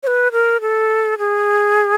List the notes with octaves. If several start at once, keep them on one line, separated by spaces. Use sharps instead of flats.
C#5
B4
A#4
A4
G#4